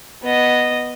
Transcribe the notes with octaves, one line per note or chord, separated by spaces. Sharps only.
B3 D#5